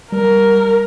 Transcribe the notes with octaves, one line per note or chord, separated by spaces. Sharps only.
G3 A#4